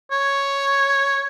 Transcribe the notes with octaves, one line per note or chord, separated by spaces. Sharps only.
C#5